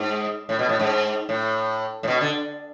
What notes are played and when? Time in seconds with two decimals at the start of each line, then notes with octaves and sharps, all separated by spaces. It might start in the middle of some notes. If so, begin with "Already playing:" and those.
Already playing: G#2
0.49 A2
0.59 B2
0.69 A2
0.79 G#2
1.29 A2
2.03 A2
2.08 B2
2.21 D3